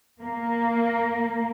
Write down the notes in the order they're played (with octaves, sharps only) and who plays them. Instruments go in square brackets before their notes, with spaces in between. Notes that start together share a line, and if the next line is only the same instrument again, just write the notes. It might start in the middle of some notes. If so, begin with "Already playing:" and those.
[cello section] A#3